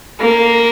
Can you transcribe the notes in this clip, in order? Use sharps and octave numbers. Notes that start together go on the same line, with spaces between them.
A#3